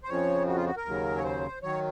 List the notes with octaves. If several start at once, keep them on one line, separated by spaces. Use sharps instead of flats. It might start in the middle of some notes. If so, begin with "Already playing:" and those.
C5
F2 C#3 F3 C#5
F#4
F4
F#4
A#4
D#2 C#3 F#3
C#5
C5
D#3 F#3 C#5